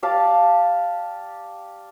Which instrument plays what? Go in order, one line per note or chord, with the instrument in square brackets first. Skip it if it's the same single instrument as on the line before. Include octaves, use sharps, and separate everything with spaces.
[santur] G4 D5 F5 A5